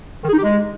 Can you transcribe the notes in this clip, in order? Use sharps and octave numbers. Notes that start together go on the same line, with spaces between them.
D#3
G#4
D#4
G4
G#3